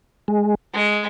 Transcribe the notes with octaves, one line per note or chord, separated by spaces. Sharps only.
G#3
G#3